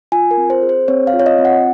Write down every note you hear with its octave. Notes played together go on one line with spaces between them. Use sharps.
F4 G#5
A#4
C4
C5
G#4
C5
C4 C#5
F5
F4
C#5
D#5
C4
F#5